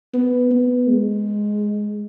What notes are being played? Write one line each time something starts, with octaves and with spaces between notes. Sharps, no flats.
B3
B3
G#3